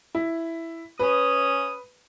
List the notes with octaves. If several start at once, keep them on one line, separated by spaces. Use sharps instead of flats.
E4
C#4 B4 D#6